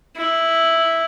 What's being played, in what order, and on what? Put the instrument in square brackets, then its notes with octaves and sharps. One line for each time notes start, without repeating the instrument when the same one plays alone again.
[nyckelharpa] E4